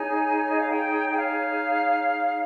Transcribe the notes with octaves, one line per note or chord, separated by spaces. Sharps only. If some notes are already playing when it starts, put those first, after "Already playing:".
Already playing: D#4 G#4 C#5 G#5
D#5
F5
G5
G5
F5